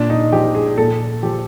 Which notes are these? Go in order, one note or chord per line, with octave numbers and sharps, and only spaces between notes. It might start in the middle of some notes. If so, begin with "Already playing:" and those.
Already playing: A#2 D4
D#4
F3 G4
G#4
A#2 A4
F3 G4